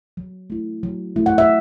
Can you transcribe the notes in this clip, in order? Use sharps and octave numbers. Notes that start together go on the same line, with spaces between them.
F#3
A3 E4
F#3
A3 E4
F#5
E5